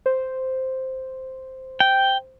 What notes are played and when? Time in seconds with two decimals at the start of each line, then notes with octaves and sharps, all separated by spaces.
0.06 C5
1.80 G5